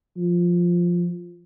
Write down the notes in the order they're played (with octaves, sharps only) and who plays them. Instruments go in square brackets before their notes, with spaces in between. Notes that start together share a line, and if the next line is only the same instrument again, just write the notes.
[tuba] F3